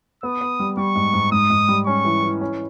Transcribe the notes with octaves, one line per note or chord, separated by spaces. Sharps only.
B3 D#6
B3
G3
G3 C#6
G#2
G#2
G#2 D#6
G#2
G3
C#4 C#6
E3
E3
C#4